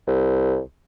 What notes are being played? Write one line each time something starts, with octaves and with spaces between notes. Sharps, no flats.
C2